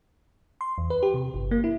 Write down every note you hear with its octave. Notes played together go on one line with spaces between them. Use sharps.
C6
E2
B4
G4
C3
G1
A#3
E4